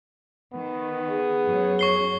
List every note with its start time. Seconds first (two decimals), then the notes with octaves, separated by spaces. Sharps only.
0.53 D#3 B3
1.09 G#4
1.48 F#2 F#3 C#5
1.79 C#6 C7 G7